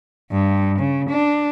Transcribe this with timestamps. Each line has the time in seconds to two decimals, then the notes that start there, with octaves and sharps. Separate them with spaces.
0.31 G2
0.79 C#3
1.10 D4